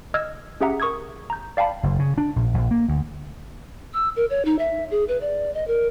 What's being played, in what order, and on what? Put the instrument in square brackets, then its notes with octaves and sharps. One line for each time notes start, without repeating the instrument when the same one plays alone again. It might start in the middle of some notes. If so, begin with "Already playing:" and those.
[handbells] D#5 E6 F6 G#6
C#4 G4 G#4 E5 F#5 A#5
A#4 C#6 D#6 E6 G#6
A#5 G6
D5 F5 G5 A5 B5
[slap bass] F#1
C#3
D4
A#1
A#1
A#3
D2
[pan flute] E6
A#4
C#5
D#4
E5
G#4
B4
D5
D#5
A#4